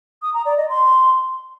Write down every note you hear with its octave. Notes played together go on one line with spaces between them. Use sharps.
D#6
A#5
D5
D#5
C6